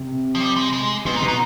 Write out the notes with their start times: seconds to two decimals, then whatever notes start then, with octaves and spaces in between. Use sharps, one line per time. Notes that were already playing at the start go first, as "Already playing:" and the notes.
Already playing: C3
0.35 F3
0.40 G3
0.56 G#3
0.73 G#3
1.05 B2 C4
1.16 D#4
1.22 B2
1.28 D#4